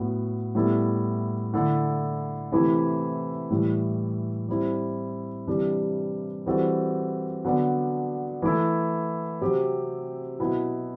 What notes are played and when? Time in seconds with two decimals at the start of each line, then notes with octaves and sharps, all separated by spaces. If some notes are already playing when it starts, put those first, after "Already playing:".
Already playing: A2 F#3 B3
0.55 A2 G3 B3 E4 A4
1.54 D3 A3 E4 A4
2.52 C3 E3 A3 E4
3.51 A2 E3 G3
4.48 G3 C4 E4
5.47 C3 E3 G3 D4 G4
6.46 E3 G3 C4 F#4 A4
7.44 D3 F#3 B3 D4
8.42 E3 A3 E4 A4
9.41 C3 F#3 C4 G4
10.39 B2 F#3 B3 E4